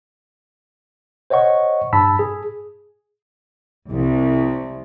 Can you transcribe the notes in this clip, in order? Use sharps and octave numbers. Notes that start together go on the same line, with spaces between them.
C5 C#5 D#5 F#5 C#6
G2 A5 B5 E6 B6
G#4
C2